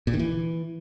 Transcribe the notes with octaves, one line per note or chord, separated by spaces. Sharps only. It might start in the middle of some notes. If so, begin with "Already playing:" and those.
A#2
D#3
E3